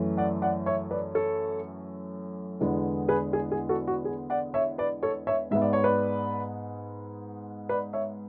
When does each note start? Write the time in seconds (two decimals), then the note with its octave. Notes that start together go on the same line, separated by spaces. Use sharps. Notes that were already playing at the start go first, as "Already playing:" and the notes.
Already playing: F#2 E3 A3
0.17 D5 F#5
0.42 D5 F#5
0.66 C#5 E5
0.91 B4 D5
1.15 A4 C#5
2.60 E2 D3 G#3 B3
3.08 G#4 B4
3.33 G#4
3.52 G#4
3.69 F#4 A4
3.88 F#4
4.05 G#4
4.30 D5 F#5
4.54 C#5 E5
4.78 B4 D5
5.03 A4 C#5
5.27 C#5 E5
5.51 G#2 G#3 B3 E5
5.62 D5
5.73 C#5
5.84 B4 D5
7.69 B4 D5
7.93 C#5 E5